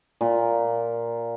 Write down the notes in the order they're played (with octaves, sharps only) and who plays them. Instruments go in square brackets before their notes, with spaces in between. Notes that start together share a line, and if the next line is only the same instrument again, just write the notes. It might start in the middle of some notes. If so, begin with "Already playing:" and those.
[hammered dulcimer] A#2